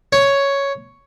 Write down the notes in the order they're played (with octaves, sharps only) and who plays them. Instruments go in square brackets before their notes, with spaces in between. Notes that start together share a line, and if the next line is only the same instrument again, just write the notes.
[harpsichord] C#5